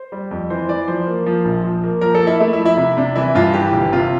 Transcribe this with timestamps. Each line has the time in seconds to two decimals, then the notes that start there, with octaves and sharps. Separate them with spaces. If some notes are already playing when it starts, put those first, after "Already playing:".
Already playing: C5
0.12 G3
0.31 F2
0.50 E3 C5
0.69 E3 D5
0.87 F3 C5
1.07 A#3
1.26 F3
1.45 A#1
1.64 F3
1.84 A#3
2.01 F3 A#4
2.15 A4
2.21 A#3
2.27 E4
2.40 A3 E4
2.53 E4
2.59 F3
2.65 E4
2.77 C3 E4
2.97 C3 D4
3.15 E3 E4
3.35 G2 F4
3.54 E3 G4
3.73 G1
3.92 C3 F4